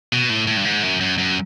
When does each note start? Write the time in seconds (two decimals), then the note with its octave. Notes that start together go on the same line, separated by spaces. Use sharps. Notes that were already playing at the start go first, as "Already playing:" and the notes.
0.13 B2
0.30 A2
0.47 A2
0.57 G2
0.65 G#2
0.83 F#2
1.01 F#2
1.18 F#2